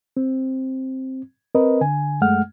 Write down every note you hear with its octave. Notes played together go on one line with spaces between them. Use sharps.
C4
C4 A#4 B4 D#5
D3 G#5
F#2 G#3 A3 F#5 F6